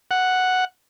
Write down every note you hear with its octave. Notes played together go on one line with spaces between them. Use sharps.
F#5